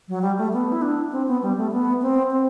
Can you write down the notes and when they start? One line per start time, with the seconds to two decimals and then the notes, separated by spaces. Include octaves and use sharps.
0.08 F#3
0.22 G3
0.38 A3
0.53 B3
0.72 E4
0.82 D4
1.12 C4
1.27 B3
1.42 G3
1.57 A3
1.72 B3
2.02 C4
2.31 C4